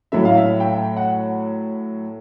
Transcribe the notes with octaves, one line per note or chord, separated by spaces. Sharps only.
A2 F#3 A3 E5
F5
E5
G5
F#5